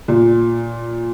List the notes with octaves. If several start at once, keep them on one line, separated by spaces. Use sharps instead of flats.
A#2